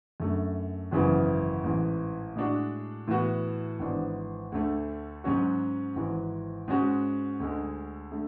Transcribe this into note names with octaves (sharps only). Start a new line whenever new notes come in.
F#2 D3 A3
G#1 F#2 C#3 E3 B3
A1 G#2 E3
A2 G#3 D4 F#4
A2 E3 B3 F#4
G#1 G#2 E3 B3 D4
D2 D3 A3
G#2 F#3 C#4 F#4
G#1 G#2 E3
G#2 G#3 C#4 F#4
D2 D3 G#3
D3 A3